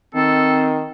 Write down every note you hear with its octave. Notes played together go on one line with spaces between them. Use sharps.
D#3 C4 A4